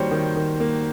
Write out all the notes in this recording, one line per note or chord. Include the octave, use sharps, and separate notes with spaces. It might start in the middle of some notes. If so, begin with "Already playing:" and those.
Already playing: D#3 G3 A#3 F#4 C5 C#5
D#3
D#3
A#3